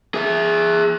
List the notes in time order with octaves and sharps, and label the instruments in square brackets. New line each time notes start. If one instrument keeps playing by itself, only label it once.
[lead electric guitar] G#4 E5